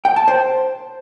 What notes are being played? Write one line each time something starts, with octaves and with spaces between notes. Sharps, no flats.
G5
A5
C5